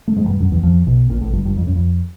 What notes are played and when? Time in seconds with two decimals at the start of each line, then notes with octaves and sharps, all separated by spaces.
0.08 A3
0.16 G#2 G#3
0.24 F#3
0.28 G2 G3
0.40 F#2 F#3
0.51 E2 E3
0.63 F2 F3
0.87 B1 B2
1.10 A#1 A#2
1.21 A1 A2
1.33 G1 G2
1.45 G1 G2
1.57 F2
1.66 F#2
1.75 F2